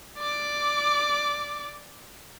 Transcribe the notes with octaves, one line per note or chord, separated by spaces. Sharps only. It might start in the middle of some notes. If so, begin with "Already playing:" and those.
D5 D6